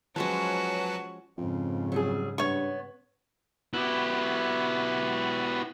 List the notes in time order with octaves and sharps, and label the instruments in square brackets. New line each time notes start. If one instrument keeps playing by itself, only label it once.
[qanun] F3 G#3 C#4 [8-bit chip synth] F#3 B4 A5 [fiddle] F#4
[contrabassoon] F2 [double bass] G#2 C#3
[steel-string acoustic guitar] F#3 G3 G#4
[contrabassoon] G2 [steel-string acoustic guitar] B3 [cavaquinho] C#5 C#6
[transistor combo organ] B3 F#4 [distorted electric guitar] E4 G4